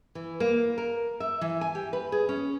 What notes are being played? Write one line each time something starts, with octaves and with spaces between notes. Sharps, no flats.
E3
A#3
A#4
E5
E3
G#5
G4
B4
G#4
C#4